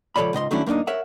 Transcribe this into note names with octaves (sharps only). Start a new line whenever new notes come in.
C#2 F3 A4 C#5 D5 B5
C#2 G#2 D#5 C6
D#3 F#3 A3 C#4 D4 E4
F#2 A#3 C4 D4 D#4
A#4 C#5 E5 F#5